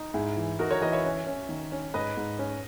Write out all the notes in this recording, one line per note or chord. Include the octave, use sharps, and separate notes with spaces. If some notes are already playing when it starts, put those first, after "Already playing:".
Already playing: D#4
G#2 E4 G#4
E3
D#4 F#4 A#4
A#4 C#5
E3 B4 D#5
C#5 E5
C#4
C#4
D#3
C#4
G#2 B4 D#5
G#2
C#4